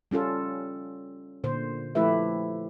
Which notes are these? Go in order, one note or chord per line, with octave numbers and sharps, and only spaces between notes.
G3 C#4 F4 A4
A#2 D3 C5
F3 A3 E4 G4 B4 E5